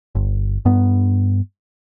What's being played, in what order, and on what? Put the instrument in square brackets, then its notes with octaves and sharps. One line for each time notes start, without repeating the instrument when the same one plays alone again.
[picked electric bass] G1
G2 B3